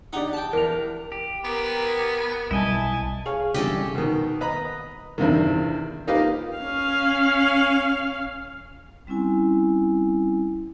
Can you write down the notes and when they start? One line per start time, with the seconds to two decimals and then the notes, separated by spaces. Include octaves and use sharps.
0.13 D3 D#4 G4 D5 F#5
0.33 G5 A5
0.53 E2 A#4 F7
1.12 G4
1.45 B3 A#4
2.51 B1 G3 E4 D#5 G#5 A5
3.26 G#4 C#5 F5
3.54 E2 C3 G3 C#4 D4 G4 A4 D#5
3.95 B2 D#3
4.41 B4 D#5 A#5 B5 D#6
5.18 E2 G2 C3 D#3
6.07 A#3 D#4 F4 G4 B4 F5
6.57 C#4 F5
9.07 G3 C4 C#4 E4 G#5